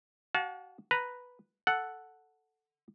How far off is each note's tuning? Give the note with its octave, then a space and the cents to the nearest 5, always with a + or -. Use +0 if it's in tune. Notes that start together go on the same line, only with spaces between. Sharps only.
F#4 +35 F#5 -45 A5 -30
B4 +0 A#5 +0
A4 +0 F#5 +0